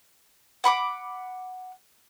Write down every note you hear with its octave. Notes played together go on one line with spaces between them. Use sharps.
F#5 B5 C#6 D6